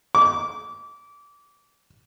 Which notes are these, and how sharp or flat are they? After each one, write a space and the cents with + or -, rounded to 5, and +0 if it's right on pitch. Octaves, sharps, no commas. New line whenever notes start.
D6 -25